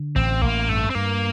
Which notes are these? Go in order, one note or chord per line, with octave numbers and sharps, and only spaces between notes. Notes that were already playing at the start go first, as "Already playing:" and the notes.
Already playing: D3
A1 C4
A1 A#3
G2 A3
C4
G2 A#3